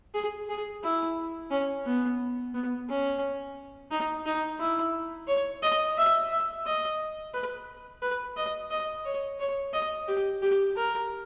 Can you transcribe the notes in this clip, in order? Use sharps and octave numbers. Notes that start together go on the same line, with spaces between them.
G#4
G#4
E4
C#4
B3
B3
C#4
D#4
D#4
E4
C#5
D#5
E5
E5
D#5
B4
B4
D#5
D#5
C#5
C#5
D#5
G4
G4
A#4